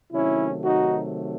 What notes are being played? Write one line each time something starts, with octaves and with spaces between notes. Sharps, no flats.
C3 D#3 F#3 A3 C#4 E4
D#4 F#4